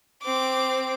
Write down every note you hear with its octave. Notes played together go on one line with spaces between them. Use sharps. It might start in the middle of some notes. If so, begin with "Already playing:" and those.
C4 D6